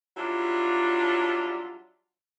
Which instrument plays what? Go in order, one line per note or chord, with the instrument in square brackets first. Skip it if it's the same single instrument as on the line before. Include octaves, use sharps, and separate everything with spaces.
[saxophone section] F#3 G3 D4 E4 F4